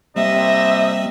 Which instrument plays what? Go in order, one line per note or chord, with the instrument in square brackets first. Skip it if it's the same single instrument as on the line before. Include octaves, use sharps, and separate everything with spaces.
[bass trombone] C3 [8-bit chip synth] G3 A#3 [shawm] D#5 [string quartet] E5